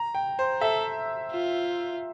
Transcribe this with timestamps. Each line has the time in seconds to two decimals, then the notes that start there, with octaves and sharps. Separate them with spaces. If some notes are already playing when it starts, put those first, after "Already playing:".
Already playing: A#5
0.15 G5
0.39 C5
0.61 A4 E5
1.32 F4